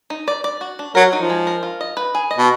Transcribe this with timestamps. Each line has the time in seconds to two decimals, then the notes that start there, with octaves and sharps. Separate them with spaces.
0.10 D#4
0.28 D5
0.44 D5
0.61 F#4
0.79 D4
0.95 F#3 A#4
1.13 D#4
1.20 F3
1.30 G#3
1.47 A#4
1.63 F4
1.81 D#5
1.97 B4
2.15 G#4
2.31 D#5
2.38 B2